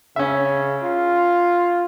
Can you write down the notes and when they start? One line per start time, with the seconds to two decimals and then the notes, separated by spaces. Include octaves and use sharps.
0.16 C#3 C#4 E5
0.82 F4